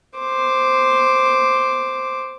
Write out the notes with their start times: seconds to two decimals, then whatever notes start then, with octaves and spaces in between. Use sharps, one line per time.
0.19 C5 D6